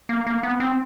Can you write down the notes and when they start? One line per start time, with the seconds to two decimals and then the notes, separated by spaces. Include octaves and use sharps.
0.09 A#3
0.27 A#3
0.43 B3
0.60 C4